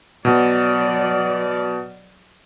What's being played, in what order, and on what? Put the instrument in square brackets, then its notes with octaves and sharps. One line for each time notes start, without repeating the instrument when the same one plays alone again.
[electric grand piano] B2 [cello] F#3 D5